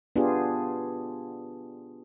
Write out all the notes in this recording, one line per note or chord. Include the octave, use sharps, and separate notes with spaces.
B3 D4 F4 G4 G#4